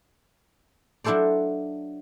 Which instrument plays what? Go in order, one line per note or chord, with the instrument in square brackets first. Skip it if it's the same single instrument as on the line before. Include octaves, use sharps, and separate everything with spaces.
[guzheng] F#3 D4 E4 A4 C5 D5